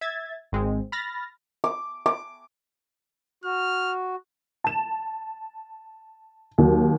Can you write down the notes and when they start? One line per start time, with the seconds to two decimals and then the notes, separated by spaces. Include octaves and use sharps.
0.01 E5 G#6 A6
0.52 G#1 G#3 C4
0.92 B5 F6 A6 A#6
1.64 D6
2.06 D6
3.44 F#4 F6
4.64 A5 E7
6.58 D#2 F#3